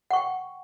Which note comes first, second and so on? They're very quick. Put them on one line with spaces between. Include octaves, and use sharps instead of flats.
F#5 C#6 G5